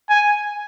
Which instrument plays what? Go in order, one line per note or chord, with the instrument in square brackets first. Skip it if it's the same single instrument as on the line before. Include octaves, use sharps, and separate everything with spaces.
[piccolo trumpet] G#5